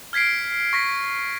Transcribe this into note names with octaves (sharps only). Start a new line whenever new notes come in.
F6 G#6 B6 C7 D7
C#6 A#6 B6